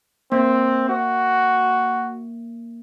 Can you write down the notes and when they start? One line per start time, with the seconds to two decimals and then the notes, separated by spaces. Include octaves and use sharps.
0.32 A#3 C4
0.89 F#4